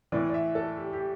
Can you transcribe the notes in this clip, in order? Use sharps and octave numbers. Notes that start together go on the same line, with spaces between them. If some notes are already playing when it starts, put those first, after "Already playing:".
A2 E3 D5
D5
E5
A4
G4
G4